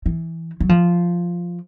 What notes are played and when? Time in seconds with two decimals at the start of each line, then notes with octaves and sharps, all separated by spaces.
0.06 E3
0.60 F#3
0.69 F3